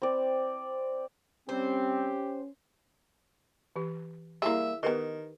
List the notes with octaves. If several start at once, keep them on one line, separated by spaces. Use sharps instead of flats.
C4 D5
G3 C4 C#4 G4 C5
E3 G4
G3 G#3 A#3 E4 G#4 E5
D#3 B3 G4 A#4 B4 D#5